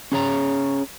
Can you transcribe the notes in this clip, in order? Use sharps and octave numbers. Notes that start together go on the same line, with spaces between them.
C#4 G#4 C#5 A#5